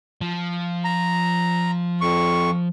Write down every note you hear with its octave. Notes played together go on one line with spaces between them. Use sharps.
F3
A#5
F2 C#6